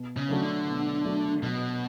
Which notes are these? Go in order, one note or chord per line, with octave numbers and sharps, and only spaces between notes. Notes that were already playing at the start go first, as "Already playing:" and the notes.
Already playing: B2
C#3
F#3 A3 D4 F#4
D3
B2
F#3 A3 D4 F#4
B2 F#3